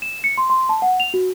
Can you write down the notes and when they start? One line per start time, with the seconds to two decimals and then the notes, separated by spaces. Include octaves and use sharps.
0.02 E7
0.24 C#7
0.38 C6
0.50 C6
0.69 A5
0.82 F#5
1.00 F7
1.14 F#4